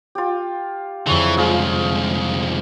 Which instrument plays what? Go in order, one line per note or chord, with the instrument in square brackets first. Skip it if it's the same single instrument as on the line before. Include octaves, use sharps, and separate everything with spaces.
[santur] F4 G4
[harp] F2 D3 [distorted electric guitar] E3 [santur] G#3 C#5
[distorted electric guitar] C2 G#2 [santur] F4 G#4 F5